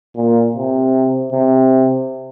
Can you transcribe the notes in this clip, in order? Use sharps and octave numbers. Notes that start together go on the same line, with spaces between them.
A#2
C3
C3